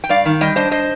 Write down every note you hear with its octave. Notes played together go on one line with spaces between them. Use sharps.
G5
G2 D5 F5
D#3
G3 D#5 G5
D4 C5 D#5
C5 D#5